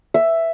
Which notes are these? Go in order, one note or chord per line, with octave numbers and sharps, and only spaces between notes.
E5